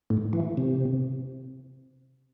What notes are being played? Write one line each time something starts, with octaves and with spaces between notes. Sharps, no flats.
A2
E3
C3